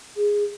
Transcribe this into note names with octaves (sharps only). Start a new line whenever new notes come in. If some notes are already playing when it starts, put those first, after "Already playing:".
G#4